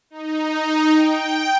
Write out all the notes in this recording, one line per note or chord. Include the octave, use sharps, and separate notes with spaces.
D#4
G5